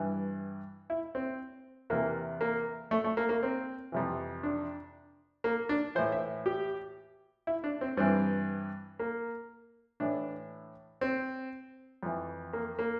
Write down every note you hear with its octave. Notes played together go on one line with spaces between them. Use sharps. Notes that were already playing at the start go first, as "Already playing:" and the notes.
Already playing: G2 E3
E4
C4
E2 C3 E3 A#3
A#3
A3
A3
A#3
A#3
C4
F2 C3 E3
D4
A#3
D4
A2 E3 C5
E5
G4
E4
D4
C4
G2 E3 C4
A#3
A2 E3 D4
C4
F2 E3
A#3
A#3